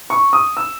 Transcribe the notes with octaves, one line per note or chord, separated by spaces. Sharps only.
C#6
D#6
E6